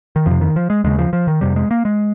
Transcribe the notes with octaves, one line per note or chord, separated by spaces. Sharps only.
D#3
F2 C3 F3
D#3
F3
G#3
D#2 C#3 G#3
F3
F3
D#3
F2 C3 G3
G#3
A#3
G#3